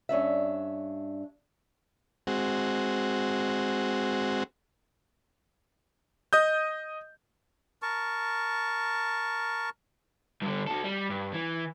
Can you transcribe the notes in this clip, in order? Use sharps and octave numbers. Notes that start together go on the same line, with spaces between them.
G2 C#4 D4 E5
G#3 C4 F#4
D#5 D#6 G6
A#4 A5 C#6
G2 D3
F#4 A4
G3
G2
E3